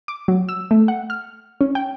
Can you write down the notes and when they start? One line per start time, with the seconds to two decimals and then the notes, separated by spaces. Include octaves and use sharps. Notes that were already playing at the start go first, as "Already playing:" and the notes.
0.08 D6
0.28 F#3
0.49 E6
0.71 A3
0.88 F#5
1.10 F6
1.61 C#4
1.75 G5